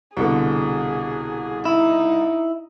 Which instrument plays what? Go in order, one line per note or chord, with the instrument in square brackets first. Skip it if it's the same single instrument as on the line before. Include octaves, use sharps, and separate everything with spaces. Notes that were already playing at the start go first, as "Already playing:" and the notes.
[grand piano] C2 B2 D3 [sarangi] G#4
[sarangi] D#4 [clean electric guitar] E4